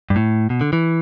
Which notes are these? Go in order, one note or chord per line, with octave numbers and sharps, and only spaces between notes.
G2
A2
B2
D3
E3